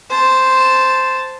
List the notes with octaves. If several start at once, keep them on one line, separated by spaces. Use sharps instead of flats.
C5 A5